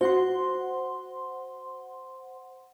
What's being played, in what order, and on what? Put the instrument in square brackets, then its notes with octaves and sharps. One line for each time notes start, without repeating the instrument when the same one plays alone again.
[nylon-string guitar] F#4 [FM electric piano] C5 F#5 C6